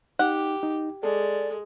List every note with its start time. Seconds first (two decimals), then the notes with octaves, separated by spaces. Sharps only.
0.19 D#4 G4 F#5
0.63 D#4
1.03 G#3 A4 D5